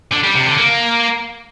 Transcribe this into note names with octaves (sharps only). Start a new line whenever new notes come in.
D3
G3
C3
D3
A#3